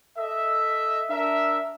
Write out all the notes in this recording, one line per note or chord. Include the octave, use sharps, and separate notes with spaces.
A4 D#5 E5
D4 A#4 E5